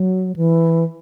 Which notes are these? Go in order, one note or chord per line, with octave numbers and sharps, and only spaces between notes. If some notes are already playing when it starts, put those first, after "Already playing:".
Already playing: F#3
E3